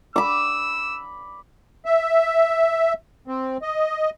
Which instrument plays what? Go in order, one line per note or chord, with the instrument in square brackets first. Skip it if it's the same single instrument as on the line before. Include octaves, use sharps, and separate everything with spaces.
[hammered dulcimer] B5 D6 [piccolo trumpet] E6
[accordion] E5
C4
D#5